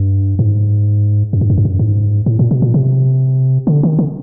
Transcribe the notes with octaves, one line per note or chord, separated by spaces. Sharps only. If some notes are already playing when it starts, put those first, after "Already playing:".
Already playing: G2
G#2
F#2
G2
F#2
G2
F#2
G#2
A2
A#2
B2
A#2
C3
D3
D#3
D3